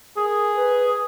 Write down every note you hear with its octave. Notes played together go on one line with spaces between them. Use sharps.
G#4 A#4
B4